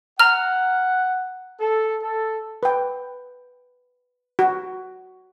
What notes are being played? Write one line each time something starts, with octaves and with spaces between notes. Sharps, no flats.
F#5 A#5 F6
A4
A4
B4 G5
F#4